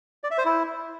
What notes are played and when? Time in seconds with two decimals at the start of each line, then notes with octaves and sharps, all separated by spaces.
0.24 D5
0.31 E5
0.38 C5
0.45 E4